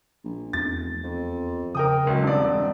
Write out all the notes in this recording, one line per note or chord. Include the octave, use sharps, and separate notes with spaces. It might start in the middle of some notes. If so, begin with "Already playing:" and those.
A#1
F1 E2 A6
F2
C#3 A#4 G5 D#6
C#2 F#3
E1 G2 C4 D5